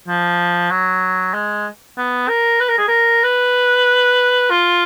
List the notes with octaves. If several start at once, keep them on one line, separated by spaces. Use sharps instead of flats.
F3
F#3
G#3
B3
A#4
B4
A#4
G#4
A#4
B4
F4